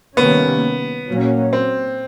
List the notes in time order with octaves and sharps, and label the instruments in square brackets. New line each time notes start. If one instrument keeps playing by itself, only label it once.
[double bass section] C3 D#3 G3 A#3 C#4 [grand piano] B3
[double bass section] A#2 F#3 A#3 C#4
[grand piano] C4